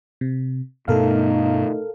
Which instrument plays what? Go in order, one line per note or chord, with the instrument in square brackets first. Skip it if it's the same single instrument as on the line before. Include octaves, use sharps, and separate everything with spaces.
[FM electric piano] C3
[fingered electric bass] G2 B2 B3 [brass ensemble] A3 D#4 [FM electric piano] A4 A#4 F5